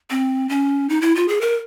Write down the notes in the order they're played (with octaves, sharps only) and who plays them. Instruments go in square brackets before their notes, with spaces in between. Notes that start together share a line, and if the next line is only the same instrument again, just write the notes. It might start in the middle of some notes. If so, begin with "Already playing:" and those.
[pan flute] C4
C#4
D#4
E4
F4
G#4
A#4